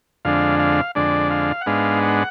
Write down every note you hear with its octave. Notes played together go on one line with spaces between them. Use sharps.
F2 D3 G#3 D4 F5
F5
F2 D3 G#3 D4 D5
F5
F#5
G#2 G#3 B3 D4 F5
F#5